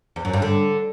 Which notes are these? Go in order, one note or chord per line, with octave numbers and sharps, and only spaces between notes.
E2
F#2
G2
D3